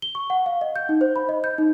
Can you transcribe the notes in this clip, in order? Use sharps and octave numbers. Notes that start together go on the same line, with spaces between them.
G7
C#6
F#5
F5
D#5
G6
D#4
C5
B5
D#5
G6
D#4